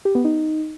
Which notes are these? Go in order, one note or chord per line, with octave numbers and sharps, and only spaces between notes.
G4
B3
D#4